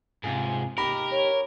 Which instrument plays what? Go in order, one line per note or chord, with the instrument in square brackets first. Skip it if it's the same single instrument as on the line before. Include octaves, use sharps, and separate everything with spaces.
[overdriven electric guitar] G#2 [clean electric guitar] C3 F4 G#4
[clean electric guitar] D#4 G4 [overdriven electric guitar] A#4 [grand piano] B5
[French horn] C#5